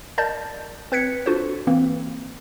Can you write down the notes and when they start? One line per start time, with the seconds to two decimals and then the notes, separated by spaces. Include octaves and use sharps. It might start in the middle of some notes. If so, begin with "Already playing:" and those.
0.18 A#4 D5 D#5 A5 G6 A6
0.92 C4 B4 F#6 G#6 B6 C#7
1.26 D4 F4 F#4 A4 C5
1.67 E3 A#3 C4